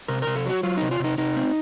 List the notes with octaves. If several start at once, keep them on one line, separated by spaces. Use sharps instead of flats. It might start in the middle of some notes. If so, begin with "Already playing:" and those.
C3 A#4
C3 A#4
A4
F#3 F#4
F#3 F4
C3 D#4
F4
C3 D#4
C3 D#4
C4